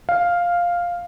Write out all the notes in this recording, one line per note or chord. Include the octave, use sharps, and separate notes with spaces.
F5